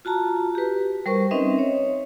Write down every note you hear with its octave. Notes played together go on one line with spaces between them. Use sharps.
F4 F#4 A5 A#5
G4 B4
G3 A#4 C5 C#6
C4 C#4 D#4 B4 D#5 E5
C#5